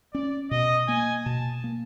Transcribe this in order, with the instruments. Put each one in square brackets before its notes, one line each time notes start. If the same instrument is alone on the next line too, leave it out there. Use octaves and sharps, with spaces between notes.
[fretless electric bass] C#4 [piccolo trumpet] D5
[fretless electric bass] B2 [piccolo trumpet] D#5
[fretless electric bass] A#3 [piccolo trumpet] G#5
[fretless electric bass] B2 [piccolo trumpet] A5
[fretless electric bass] A#3